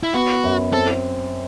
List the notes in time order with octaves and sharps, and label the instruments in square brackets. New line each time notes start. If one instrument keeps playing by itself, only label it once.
[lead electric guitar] E4
[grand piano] B3 [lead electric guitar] F#4
[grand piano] F#2
[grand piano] C4 [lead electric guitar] A4